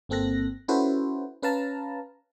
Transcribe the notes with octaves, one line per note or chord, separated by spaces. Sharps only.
G1 A#3 C4 A4 F#6 A#6
C#4 E4 F#4 A4 B4 C5
C#4 B4 F5 A5 A#5